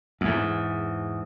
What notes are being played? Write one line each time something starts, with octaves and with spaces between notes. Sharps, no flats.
E2 G#2